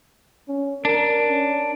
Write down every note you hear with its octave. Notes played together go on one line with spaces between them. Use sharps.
C#4
D4 A#4
C#4